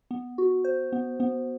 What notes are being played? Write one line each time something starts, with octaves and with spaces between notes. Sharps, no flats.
B3
F#4
C5
B3
B3